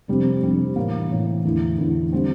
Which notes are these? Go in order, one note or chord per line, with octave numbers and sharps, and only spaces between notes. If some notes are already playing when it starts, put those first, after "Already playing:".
F2 C3 G3 D4
F2 C3 G3 D4
A2 E3 A#3
A2 E3 A#3
E2 D3 A3 E4
E2 D3 A3 E4
D3 G3 C4